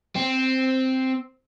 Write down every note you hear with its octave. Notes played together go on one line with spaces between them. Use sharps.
C4